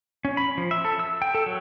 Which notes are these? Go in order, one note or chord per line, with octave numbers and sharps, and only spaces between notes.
C#4
B5
F3
E5
A4
E6
G5
A4
F#3